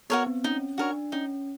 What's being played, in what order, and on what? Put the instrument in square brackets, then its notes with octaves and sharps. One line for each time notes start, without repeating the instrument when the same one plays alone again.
[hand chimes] B3 [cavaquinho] F#4 A#4 C#5
[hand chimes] C4
[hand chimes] C#4 [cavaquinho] D#4
[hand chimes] D4 [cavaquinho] F#4 A#4 C#5
[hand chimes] C#4 [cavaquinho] D#4